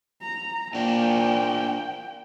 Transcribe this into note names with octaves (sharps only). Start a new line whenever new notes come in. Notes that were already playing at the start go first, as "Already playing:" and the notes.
A#5
A#2 A#3 D4 G5